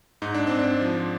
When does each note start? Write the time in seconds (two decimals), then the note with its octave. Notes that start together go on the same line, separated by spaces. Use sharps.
0.22 G#2 D#4
0.34 D4
0.47 G#2 C4
0.59 D4
0.81 F3